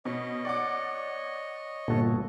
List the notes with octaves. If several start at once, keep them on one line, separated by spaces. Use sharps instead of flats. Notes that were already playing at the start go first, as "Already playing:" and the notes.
B2 C#5 D#5
D5 F#5 D6
G1 A#2 F#4 A4